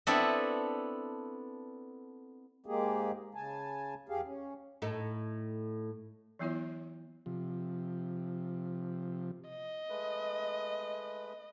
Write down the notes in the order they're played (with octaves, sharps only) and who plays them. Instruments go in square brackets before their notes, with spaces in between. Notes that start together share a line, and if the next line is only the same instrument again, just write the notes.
[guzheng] B3 C4 D4 E4 A4
[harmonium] G#2 G#3 A#3 G4 G#4
C#3 G#5 A5
E2 G4 G#4 F5
C#4
[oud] A2 D#4 A4
[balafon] E3 F#3 B3 E4 F4 C#5
[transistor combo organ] C3 F3
[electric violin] D#5
[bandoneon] G#3 A3 B4